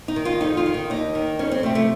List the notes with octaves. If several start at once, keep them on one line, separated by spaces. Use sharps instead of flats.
D#4
D#3
F4
F2 D#4
F4
D#3
D#4
D#2 D#4
D#3
F2 C#4
C4
C3 F3 A3
A3